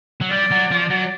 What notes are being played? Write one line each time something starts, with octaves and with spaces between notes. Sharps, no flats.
F#3
G3 D5
F#3
F3
F#3